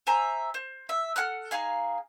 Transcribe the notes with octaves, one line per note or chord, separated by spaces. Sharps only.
C5 E5 G#5 A#5
C5
E5
A4 F#5 F6 F#6
D#4 G#4 F5 G#5